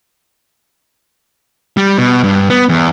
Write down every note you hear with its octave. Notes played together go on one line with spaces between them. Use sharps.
G3
B2
G2
B3
E2